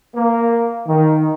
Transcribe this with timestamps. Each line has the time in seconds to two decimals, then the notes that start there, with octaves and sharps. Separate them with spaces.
0.15 A#3
0.87 D#3